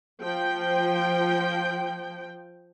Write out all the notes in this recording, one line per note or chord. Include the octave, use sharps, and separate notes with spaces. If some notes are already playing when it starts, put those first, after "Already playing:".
F3 G5